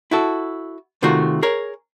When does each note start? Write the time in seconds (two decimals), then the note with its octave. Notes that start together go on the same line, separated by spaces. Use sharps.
0.11 E4 F#4 A4
1.02 C3 D#3 A3 F4 F#4
1.42 G#4 A#4 C#5